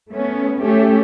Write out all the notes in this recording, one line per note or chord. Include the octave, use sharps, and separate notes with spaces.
A3 B3 C#4
A3 C#4 G4